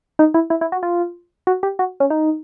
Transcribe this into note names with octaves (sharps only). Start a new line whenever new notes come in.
D#4
E4
E4
E4
F#4
F4
F#4
G4
F#4
C#4
D#4